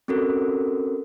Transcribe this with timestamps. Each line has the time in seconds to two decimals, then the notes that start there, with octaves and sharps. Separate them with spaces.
0.08 C4 C#4 F#4 A4 A#4